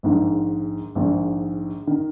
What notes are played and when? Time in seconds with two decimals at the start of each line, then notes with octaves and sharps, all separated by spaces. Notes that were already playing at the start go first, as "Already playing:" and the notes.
0.03 A#1 G#2 D#3
0.95 A#1 G#2 D#3
1.87 D#3